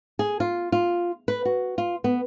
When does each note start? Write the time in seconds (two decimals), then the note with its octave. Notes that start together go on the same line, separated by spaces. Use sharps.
0.19 G#4
0.40 F4
0.72 F4
1.28 B4
1.45 F#4
1.78 F4
2.04 B3